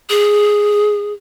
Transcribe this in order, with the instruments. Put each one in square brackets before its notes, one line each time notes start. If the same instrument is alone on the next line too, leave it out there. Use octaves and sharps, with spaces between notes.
[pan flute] G#4